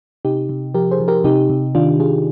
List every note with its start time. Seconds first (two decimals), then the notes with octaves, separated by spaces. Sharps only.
0.25 C3 D#4 G4
0.49 C3
0.74 F3 G4 A#4
0.91 G#4 C5
1.00 F3
1.08 G4 A#4
1.24 C3 D#4 G4
1.50 C3
1.75 D#3 D4 F4
2.00 D#3 F4 G#4